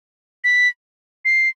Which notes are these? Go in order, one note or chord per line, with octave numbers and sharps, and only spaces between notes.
B6
C7